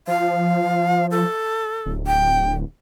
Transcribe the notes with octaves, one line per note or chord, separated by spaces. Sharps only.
F3 F5
A4
D1
G5